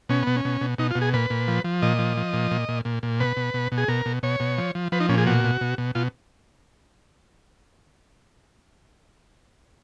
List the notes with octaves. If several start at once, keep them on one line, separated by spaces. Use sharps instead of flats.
B2 C#4
B2 B3
C#4
B2
B2
B2 D#4
F4
B2
G#4
A#2 B4
A#2
F3
F3
A#2 D#5
F3
F3
A#2
A#2
A#2
A#2
A#2
B2 B4
B2
B2
B2
G#4
B2 A#4
B2
B2 C#5
B2
F3
F3
F3 B4
D#4
A#2 C#4
G#4
B2 F#4
B2
B2
B2
B2 F4